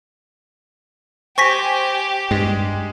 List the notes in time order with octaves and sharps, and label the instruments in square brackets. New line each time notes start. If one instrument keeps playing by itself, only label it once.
[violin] G4 [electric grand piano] C5 G#5 [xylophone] C#6 A#6 B6
[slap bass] G2 [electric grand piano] G#3